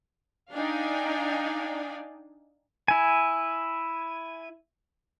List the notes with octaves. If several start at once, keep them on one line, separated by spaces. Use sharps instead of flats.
D4 D#4 D5 F5 G5 G#5
E4 G#5